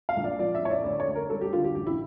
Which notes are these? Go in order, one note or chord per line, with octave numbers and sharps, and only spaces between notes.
F5
A#1
D5
F3 D5
E5
A2 C#5
D5
D2 D5
C#5
D2
A#4
G3 A4
G4
D3 F4
G4
A1 G4
E4